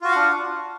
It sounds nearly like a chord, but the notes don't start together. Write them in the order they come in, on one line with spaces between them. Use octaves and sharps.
F4 F#4 F5 F#5 D4